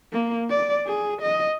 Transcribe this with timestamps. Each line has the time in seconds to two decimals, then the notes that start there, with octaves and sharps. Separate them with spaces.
0.12 A#3
0.50 D5
0.86 G#4
1.22 D#5